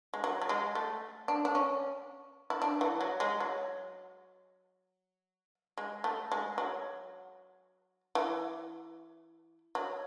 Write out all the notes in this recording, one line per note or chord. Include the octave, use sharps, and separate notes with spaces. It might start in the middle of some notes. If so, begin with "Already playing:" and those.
G#3
F#3
F#3
G#3
A3
D4
D4
C#4
E4
D4
E3
F#3
G#3
F#3
G#3
A3
G#3
F#3
E3
F#3